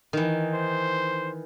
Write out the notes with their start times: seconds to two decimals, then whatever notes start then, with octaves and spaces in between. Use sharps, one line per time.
0.13 D#3 E3
0.54 C5